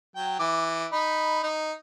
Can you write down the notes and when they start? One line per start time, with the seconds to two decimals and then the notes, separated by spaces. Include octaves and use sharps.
0.16 F#3 G5
0.39 E3 D6
0.92 D#4 B5
1.43 D#4